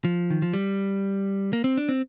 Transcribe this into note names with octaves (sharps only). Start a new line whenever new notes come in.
F3
D#3
F3
G3
A#3
C4
D4
C4